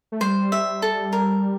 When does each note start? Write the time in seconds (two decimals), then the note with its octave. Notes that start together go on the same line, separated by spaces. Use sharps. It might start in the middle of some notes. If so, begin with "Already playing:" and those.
0.12 A3
0.21 G3 C5
0.52 E5
0.82 A4
1.13 A#4